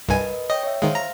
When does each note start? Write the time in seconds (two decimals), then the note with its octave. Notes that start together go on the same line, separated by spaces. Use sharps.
0.08 C2 G2 A#4 B4 D#5 G#5
0.31 D#5
0.50 C#5 D#5 G5
0.63 C#5 E5
0.82 D#3 G#3 C5 F5
0.95 A#5